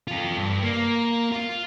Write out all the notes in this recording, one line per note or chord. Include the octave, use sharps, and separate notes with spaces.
F4 A4
G2
A#3
F4